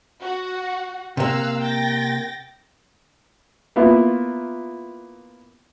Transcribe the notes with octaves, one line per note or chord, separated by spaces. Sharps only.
F#4 F#5
C3 A#3 F5 E6 F#6
G5 A6 A#6
A#3 B3 E4 F4